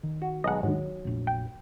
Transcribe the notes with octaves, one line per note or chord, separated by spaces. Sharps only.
D#3
F#4
B1 G#3 D#5 F#5
D#2 G#2 F#3
F1 A#1
G5